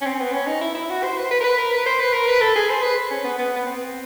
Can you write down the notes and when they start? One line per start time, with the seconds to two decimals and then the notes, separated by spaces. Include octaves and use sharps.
0.01 C#4
0.06 C4
0.20 B3
0.33 C#4
0.47 D#4
0.61 E4
0.75 E4
0.90 F#4
1.03 C5
1.17 B4
1.24 C5
1.31 B4
1.40 A#4
1.44 B4
1.58 A#4
1.73 B4
1.86 C5
2.00 B4
2.13 A#4
2.28 B4
2.41 A4
2.56 G#4
2.70 C5
2.82 B4
3.11 C#4
3.24 B3
3.38 B3
3.56 B3
3.66 C4